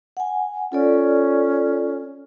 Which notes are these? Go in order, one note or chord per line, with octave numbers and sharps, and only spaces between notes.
F#5 G#5
C#4 F4 A4 D5